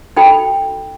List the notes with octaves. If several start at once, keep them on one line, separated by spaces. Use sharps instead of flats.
D#4 F#4 A4 G5 B5